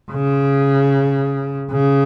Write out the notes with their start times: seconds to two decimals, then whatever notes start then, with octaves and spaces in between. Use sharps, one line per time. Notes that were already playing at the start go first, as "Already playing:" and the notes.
0.12 C#3
1.72 C#3